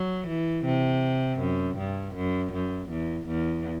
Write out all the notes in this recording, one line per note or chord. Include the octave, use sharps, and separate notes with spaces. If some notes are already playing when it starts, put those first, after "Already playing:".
Already playing: F#3
E3
C3
F#2
G2
F#2
F#2
E2
E2